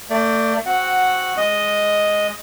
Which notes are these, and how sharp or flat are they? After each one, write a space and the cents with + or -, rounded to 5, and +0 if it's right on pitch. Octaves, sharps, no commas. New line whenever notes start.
A3 +35 D5 +0
C4 +0 F#4 -5 F#5 +0
G#3 +0 D#5 +0